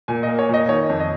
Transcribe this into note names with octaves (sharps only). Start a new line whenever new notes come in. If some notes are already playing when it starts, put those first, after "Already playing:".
A#2 G#5
D#5
A#3
C#5
A#2 D#5
D#3 C#5
F2
D#5